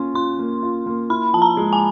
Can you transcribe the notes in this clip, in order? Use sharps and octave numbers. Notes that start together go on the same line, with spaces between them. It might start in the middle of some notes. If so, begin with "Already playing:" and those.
Already playing: A#3 C#4 F4 C6
F4 C6
A#3
F4
A#3
E4 B5
F3 A5
A#5
G#3
G#5